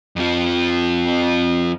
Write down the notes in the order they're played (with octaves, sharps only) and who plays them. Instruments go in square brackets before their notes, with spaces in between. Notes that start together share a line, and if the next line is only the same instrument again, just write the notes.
[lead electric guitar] F2 F3